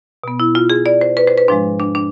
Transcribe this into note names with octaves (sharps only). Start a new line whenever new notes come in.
B2 B3
E4
F4
G#4
D5
C5
B4
C5
B4
G#2 F3 G#3 D4
D4
D4